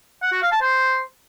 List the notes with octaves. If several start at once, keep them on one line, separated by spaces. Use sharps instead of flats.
F#5
F#4
F5
A5
C5